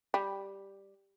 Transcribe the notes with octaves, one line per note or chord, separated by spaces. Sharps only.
G3